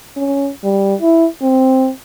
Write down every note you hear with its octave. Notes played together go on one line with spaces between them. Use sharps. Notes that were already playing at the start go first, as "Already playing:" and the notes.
C#4
G3
E4
C4